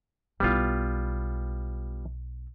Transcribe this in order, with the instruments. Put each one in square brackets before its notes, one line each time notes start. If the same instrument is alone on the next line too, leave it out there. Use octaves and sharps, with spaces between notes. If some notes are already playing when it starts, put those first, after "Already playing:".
[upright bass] B1 E4 [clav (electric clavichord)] G3 B3 F4